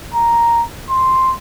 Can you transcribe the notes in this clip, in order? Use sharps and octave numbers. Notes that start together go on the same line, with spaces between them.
A#5
C6